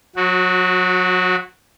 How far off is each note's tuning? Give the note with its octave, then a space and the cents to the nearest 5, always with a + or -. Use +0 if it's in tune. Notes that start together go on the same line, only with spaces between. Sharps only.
F#3 -30 F#4 -5